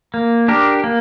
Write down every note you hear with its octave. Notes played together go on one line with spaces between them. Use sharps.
A#3
D4 G4 A#4
A#3